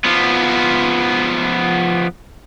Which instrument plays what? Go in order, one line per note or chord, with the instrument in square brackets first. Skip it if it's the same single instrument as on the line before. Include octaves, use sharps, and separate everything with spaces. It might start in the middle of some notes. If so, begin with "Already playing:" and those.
[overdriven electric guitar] F3 B3